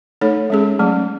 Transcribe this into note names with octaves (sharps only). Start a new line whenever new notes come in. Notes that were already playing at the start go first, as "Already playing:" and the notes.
A3 D#4 A4 C#5
G#3 C#4 G#4
F#3 A3 C#4